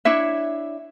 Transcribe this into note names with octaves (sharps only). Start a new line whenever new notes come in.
D4 E4 C#5 E5